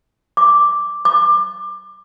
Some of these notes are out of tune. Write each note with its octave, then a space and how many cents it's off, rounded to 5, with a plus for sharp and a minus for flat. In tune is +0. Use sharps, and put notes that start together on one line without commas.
D6 +0
D6 +20